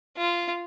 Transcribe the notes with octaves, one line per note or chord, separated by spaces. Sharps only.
F4